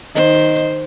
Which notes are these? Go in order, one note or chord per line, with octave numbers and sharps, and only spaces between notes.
D#3 C5 D#5